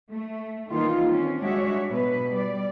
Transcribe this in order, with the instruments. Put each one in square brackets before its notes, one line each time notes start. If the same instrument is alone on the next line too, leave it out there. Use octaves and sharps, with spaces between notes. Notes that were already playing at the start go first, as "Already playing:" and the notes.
[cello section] A3
D#3 E3 G3 A#3 D#4 F4
C4 C#4
G3 G#3 D4 F#4 C#5 E5
B2 F#3 B4
G3 D5